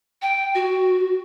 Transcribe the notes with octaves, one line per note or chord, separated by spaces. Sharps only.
G5
F#4